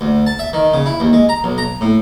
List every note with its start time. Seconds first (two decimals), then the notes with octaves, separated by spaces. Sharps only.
0.01 D2
0.27 A5
0.39 E5
0.53 D#3
0.74 C#3
0.86 E4
1.00 D#2
1.13 G#3
1.29 A#5
1.44 B1
1.58 A#5
1.81 A2